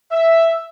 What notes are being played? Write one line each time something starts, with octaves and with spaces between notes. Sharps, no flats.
E5